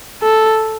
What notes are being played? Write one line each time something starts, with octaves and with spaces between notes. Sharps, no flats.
A4